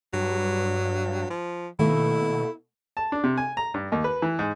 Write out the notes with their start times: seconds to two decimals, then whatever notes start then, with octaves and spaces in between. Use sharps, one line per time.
0.14 G2 F#3
1.30 F3
1.79 B2 D#3 A3 A#3 E4
2.97 A5
3.12 D4
3.24 C3
3.37 G#5
3.57 A#5
3.74 G2
3.92 D#2
4.04 B4
4.22 E3
4.39 G#2